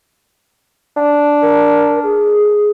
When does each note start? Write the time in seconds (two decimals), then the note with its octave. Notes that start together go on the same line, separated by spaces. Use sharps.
0.97 D4
1.42 A#4
2.03 G#4